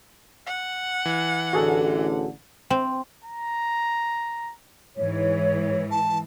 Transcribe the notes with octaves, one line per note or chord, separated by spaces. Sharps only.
F#5
E3
A1 D3 F#4 G#4 A4
C4
A#5
G#2 E3 C#5
A5